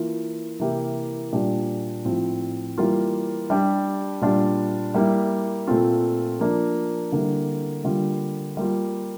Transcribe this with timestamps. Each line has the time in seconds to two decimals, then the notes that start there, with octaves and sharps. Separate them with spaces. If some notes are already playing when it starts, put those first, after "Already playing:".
Already playing: E3 A#3 F4
0.59 C3 E3 A#3 E4 G4
1.33 A#2 G3 D4 G4
2.05 A2 F3 C4 F4
2.78 E3 G3 A#3 F4
3.50 G3 D4 G4
4.21 A#2 G3 D4 F4
4.94 G3 A#3 E4
5.67 A#2 A3 C4 F4
6.39 F3 A#3 D4
7.12 D3 G3 A#3 E4
7.84 D3 G3 A#3 F4
8.57 G3 A#3 F4